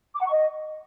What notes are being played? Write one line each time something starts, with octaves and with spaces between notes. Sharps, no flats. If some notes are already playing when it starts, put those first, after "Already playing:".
D6
F#5
C#6
D#5